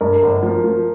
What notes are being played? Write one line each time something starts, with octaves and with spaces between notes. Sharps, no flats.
G2 A#4
G1
F3
F3